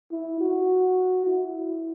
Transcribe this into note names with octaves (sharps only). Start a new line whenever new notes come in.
E4
F#4
E4